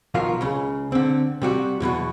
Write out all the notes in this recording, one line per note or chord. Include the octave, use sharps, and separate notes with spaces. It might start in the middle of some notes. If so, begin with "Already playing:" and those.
B1 F3 F#3 F4 A#4 F5
C#2 C#3
D3 C4
C3 G3 F#4
E2 B2 D#3 F#3